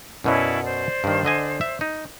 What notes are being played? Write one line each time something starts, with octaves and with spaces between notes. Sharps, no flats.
F#2 B2 F#3 C#4 E4 D5
C5 D5
G2 D#3
D3 D#5 G#5
E5
D#4